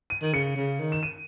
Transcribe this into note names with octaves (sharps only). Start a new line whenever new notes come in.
D#7
D#3
C#3 C#7
C#3
D#3
E7
D#7